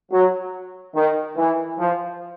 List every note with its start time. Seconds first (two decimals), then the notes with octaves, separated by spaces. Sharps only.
0.11 F#3
0.95 D#3
1.36 E3
1.78 F3